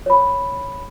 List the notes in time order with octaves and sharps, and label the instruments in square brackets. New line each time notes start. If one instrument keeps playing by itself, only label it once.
[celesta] C#5 B5